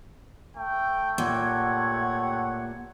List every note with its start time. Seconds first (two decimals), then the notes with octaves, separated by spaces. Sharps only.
0.57 A3 G5
1.18 A#2 G4 C#5 F#5 G#6